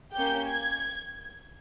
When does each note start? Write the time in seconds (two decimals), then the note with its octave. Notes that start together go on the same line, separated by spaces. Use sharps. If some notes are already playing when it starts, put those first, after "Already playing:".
0.14 A#3 C#4 G4 G6
0.48 G#6